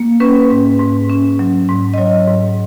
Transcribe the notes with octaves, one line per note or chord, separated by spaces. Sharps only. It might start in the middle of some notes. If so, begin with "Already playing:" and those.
Already playing: A#3
C#4 B4
G#2
G#2
C#4
F#3
G#2
D#5
F#3 C#5
G#2